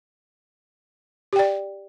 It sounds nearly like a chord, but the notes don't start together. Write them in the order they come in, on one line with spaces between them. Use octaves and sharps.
G4 G5 D5